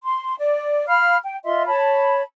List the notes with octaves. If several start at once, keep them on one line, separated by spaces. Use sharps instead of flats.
C6
D5
F5 B5 F6
G5
F4 D#5 E5 C6
C#5 A5 B5